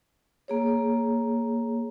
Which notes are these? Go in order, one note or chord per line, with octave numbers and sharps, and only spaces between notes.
A#3 G#4 C#5